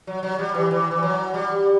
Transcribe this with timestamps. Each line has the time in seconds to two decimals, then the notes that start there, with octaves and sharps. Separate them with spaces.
0.07 F#3
0.23 F#3
0.39 G3
0.55 E3
0.71 E3
0.91 E3
1.03 F#3
1.34 G3